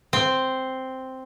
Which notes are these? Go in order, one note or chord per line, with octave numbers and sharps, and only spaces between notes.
C4